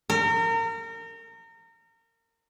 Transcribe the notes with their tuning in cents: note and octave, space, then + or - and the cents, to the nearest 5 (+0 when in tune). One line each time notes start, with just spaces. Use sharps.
A#4 -30